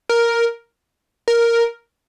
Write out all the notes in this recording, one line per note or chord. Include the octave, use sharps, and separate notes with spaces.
A#4
A#4